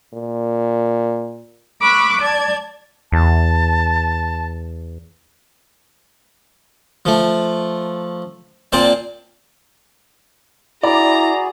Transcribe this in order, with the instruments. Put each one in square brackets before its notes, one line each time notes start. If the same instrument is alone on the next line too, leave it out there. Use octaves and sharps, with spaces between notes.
[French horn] A#2
[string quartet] B5 C#6 D6 E6 F#6
D5 A5 G#6
[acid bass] E2 [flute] A5
[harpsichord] F3 A3
A#2 C4 C5 D5 A5
[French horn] E4 [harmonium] F#4 G#4 [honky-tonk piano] D5 B5 D6 [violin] A#5